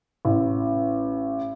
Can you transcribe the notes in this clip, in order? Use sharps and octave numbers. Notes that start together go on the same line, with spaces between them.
A1